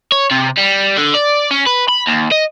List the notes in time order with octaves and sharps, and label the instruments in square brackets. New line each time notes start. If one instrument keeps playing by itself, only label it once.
[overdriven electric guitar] C#5
C3
G3
D3
D5
C#4
B4
B5
D#2
D#5